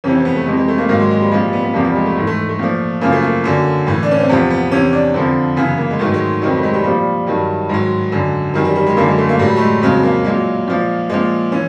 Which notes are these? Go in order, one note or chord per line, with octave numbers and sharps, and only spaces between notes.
F2 C3 E3 C#4
C4
B3
A3
F2 C3 E3 G#3
G#3
A3
A#3
G#2 D#3 F#3 A#3
G#3
G#3
G3
A#2 F3 G#3
G3
B3
B3
E2 C3 F3 A#3
G3
G#3
A3
G#2 E3 A3
A3
A3
A#2 F3
F#2 C#3 F3 A#3
A3
A#3
F#2 D3 F#3
A2 E3
D4
C#4
C4
E2 C3 F3 B3
B3
E2 C3 E3 C#4
D4
F2 D3 F3 C4
F#2 C#3 E3 B3
A#3
G#3
G#2 D#3 F#3 A3
G#3
F2 C3 D#3 F#3 G3
A3
G#3
G3
A#2 F3 G3
G2 D#3 F#3
G#2 D#3 F#3 G#3
F#2 D3 F#3
F#2 D#3 F#3 G3
G3
G3
G#3
F#2 D3 F#3 A#3
G#3
A3
A#3
A2 F#3 G3
A3
G#3
F2 C#3 F#3 G#3
A#3
A#2 F#3 G#3
A#2 F3
A#2 F3 G#3
E3 C#4